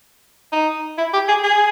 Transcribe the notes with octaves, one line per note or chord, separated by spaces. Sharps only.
D#4
E4
G4
G#4
G#4